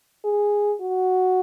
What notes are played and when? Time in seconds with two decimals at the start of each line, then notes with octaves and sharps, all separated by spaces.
0.25 G#4
0.81 F#4